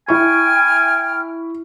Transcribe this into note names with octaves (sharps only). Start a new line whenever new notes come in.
E4 G5 G#5 C#6 F6